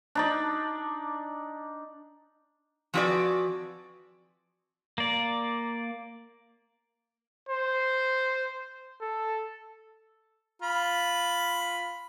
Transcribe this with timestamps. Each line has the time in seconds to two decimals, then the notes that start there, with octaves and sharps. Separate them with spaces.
0.15 D4 D#4 D5
2.94 F3 C4 F#4 G#4 B4 D5
4.98 A#3 D5
7.49 C5
9.01 A4
10.62 F4 B5